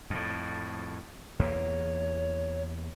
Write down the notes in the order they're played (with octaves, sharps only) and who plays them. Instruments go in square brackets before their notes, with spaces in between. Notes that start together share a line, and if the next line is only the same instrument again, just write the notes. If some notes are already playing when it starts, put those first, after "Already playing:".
[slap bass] F2 A2
[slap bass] E2 A#3 [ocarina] C#5